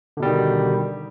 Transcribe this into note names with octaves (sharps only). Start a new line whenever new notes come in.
B2 D3 D#3 G3